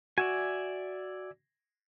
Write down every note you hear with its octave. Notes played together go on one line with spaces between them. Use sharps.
F#4 D5 E5 G#5